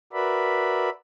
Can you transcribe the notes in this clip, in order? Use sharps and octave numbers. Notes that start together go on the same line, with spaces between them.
F#4 A#4 B4 D5 E5 B5